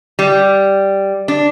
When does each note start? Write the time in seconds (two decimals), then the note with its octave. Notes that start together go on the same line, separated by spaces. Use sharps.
0.19 G3
1.28 D4